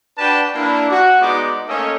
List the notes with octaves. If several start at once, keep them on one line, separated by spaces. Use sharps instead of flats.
D4 F#4 B4 D5 G5 A5
A#3 D4 E4
F#4
G#3 B3 D#4 D5 D6
A3 A#3 C#4 A4 C#5 D#5